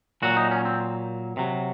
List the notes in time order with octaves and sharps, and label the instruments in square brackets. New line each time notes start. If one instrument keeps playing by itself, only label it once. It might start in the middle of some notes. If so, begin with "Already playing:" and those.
[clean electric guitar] A#2 F#3 F#4
D#4
C#4
C4
C3 F#3